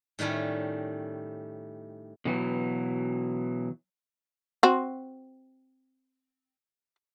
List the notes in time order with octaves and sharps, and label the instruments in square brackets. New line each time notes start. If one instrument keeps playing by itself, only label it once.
[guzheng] A2 D#3 G3 A3 C#4
[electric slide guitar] B2 E3 F#3
[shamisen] C4 F#4